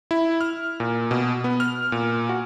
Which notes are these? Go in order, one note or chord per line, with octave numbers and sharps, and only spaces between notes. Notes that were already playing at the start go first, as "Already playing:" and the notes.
E4
F6
A#2
B2
B3
F6
A#2
F#4